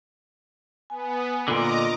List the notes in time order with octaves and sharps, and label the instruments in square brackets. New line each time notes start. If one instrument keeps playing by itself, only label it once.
[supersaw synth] B3 [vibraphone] G#5
[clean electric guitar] A#2 D3 [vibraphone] F4 [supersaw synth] D#5 A#5 D6